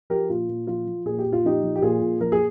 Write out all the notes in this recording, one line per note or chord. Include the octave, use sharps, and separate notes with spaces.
F3 G4 A#4
A#2 F4
A#2
F3 F4
F3
A#2 G#4
G4
A#2
F4
F3 D#4 G4
F3
G4
A#2 F4 G#4
A#2
F3 A#4
G#4